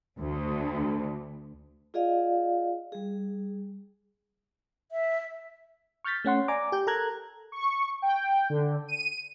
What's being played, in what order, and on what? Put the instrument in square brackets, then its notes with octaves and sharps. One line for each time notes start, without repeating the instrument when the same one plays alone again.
[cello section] D2
[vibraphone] F4 G#4 D5 D#5 F5
G3 G#4
[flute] E5
[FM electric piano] C#6 F6 G6 A6 B6
A3 C#4 F#5 C6
D5 G#5 A#5 D6
G4 G6
A4 A#4 A#5 F#6 G#6
[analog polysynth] C#6
G5
D3
D#7